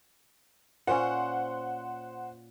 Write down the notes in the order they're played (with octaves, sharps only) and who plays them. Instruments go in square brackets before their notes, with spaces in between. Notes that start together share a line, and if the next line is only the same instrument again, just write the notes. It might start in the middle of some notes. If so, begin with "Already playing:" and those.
[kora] A#2 C#4 [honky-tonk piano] C5 F#5